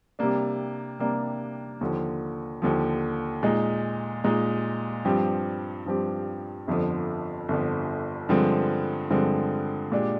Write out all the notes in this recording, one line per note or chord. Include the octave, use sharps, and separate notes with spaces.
C3 G3 A#3 D4
C3 G3 A#3 D4
D#2 D3 F3
D#2 D3 F3
A#2 G#3 D#4
A#2 G#3 D#4
G2 F3 C4 G4
G2 F3 C4 G4
G1 F2 D3 F3
G1 F2 D3 F3
G2 D3 F3 G#3 C4
G2 D3 F3 G#3 C4
A#2 G#3 D4 G4